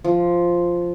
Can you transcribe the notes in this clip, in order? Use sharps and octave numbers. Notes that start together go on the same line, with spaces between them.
F3